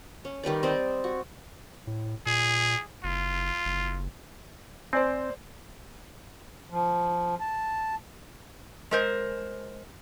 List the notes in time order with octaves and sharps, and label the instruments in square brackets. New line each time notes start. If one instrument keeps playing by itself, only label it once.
[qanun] C#4
D#3 G3 B4 D5
C4 D5 D#5
F#4
[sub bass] A2
[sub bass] A#2 [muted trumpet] G#4
[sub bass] F#1 [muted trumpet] F4
[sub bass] F#1
[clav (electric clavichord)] C4 [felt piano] C5 D5 G#5
[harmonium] F3
A5
[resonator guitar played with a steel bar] G#3 A#4 C5